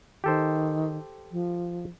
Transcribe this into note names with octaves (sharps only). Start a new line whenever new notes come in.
D#3 G4 A4 C5
F3